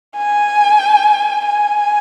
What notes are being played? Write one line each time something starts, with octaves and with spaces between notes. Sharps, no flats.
G#5
G#5